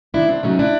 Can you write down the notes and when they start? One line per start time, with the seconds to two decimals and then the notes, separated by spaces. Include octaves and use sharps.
0.14 D#3 D4 E4
0.29 C4 D4
0.43 F#3 A3 C#4 D#4
0.59 D4 E4